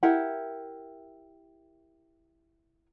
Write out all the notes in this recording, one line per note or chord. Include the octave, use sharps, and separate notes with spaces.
E4 G4 A#4 F#5